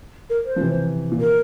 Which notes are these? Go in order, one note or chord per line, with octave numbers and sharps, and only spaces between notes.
A#4
C5
F3
C3 E3
A#2
A#4